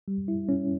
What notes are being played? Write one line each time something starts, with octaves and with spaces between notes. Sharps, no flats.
G3
E4
C#4